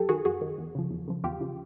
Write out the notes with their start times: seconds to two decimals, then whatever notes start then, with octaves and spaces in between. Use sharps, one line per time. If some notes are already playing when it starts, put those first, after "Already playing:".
Already playing: F#2 G4 A4
0.09 D#3 F#4 G#4
0.25 F#2 F#4 G#4
0.41 D#3
0.58 E2
0.75 C#3 F3
0.91 E2
1.08 C#3 F3
1.24 E2 F4 G4
1.41 C#3 F3